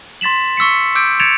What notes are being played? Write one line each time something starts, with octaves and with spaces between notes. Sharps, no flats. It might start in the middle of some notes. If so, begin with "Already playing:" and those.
C6 A6 B6 E7 F#7
C#6 E6 B6 C#7
D6 E6 G6 D7
G#6 A6 C#7 D7 E7 F7